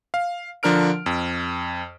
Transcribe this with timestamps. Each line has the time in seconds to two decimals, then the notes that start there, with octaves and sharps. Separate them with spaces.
0.14 F5
0.63 D3 F3 D4 A#4 F6 D7
1.06 F2